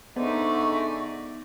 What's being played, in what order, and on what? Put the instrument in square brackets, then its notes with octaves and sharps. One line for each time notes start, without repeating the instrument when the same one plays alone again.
[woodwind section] G#2 D3 [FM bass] B3 [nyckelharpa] D#4 D5 [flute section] E5 C#6